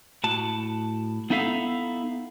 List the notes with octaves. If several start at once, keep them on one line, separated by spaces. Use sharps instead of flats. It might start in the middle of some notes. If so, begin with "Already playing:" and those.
A2 F#4 A5
B3 D#4 E4 A4 E5 F5